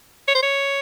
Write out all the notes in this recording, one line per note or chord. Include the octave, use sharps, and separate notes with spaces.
C#5
C5
C#5